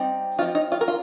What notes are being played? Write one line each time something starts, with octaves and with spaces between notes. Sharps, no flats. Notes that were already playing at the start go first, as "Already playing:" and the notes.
Already playing: G3 C4 D#4
F3 C4 D#4 F4
D#4
F4
A#4
F4